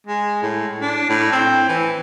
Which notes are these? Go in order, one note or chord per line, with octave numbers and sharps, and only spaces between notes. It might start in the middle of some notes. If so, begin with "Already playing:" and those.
G#3
A2
D4
A2
C4
E3